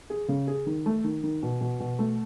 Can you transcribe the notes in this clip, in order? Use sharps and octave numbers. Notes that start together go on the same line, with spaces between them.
G#4
C#3
G#4
D#3
A3
D#3
D#3
B2
B2
B2
A3